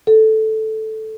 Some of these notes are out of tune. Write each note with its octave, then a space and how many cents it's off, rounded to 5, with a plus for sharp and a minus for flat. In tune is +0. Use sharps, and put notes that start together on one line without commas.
A4 -5